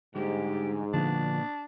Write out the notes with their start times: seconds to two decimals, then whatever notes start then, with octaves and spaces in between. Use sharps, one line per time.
0.15 G#2 D3 G3 G#3 G4
0.93 A#2 D3 F3 B3 D4